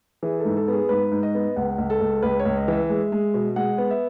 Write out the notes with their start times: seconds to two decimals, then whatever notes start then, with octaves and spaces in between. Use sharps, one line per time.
0.23 E3 G#4
0.40 A4
0.45 G#2
0.56 A4
0.68 B3 G#4
0.89 G#2 B4
1.12 G#2
1.23 D#5
1.35 B3
1.56 C#2 F#5
1.78 C#2
1.90 A4
2.01 C#2
2.23 C#2 B4
2.39 C#5
2.45 C#2
2.57 D#5
2.68 E3 E5
2.89 G#3
3.12 G#3
3.34 B2
3.56 G#3 F#5
3.78 B3
3.91 E5